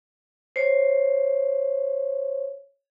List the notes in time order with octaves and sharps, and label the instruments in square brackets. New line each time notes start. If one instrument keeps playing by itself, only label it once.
[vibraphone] C5 C#5